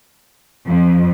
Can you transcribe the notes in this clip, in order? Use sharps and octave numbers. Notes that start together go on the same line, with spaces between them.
F2